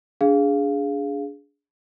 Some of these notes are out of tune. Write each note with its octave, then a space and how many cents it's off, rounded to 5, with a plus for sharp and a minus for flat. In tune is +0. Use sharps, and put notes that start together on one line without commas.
D4 -25 G#4 +0 F5 +0